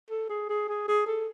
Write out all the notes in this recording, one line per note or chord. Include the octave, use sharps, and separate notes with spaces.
A4
G#4
G#4
G#4
G#4
A4